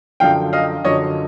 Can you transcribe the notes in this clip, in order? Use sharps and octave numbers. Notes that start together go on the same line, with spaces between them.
F#2 D3 F3 F5 G5
D#5 F5
F#2 D3 F3 C#5 D#5